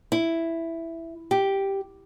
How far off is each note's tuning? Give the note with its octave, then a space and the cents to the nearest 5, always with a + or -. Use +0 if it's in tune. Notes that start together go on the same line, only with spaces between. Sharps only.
E4 +5
G4 +0